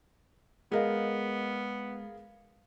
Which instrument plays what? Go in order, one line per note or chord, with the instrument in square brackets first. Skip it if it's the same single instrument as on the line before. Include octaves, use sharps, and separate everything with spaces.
[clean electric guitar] G#3 D#5 [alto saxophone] B3 [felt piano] G#4 A#4 F5